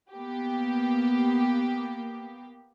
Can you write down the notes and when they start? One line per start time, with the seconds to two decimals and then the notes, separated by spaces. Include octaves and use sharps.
0.13 A#3 B3 G4